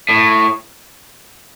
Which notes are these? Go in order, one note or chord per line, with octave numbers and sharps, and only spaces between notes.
A2